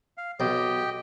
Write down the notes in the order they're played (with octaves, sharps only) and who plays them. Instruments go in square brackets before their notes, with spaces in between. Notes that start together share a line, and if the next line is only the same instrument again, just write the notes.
[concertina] F5
[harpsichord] B1 [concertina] G4 D#5 G5